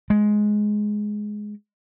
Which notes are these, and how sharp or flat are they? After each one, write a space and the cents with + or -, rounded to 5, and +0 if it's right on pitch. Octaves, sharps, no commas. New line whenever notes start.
G#3 +10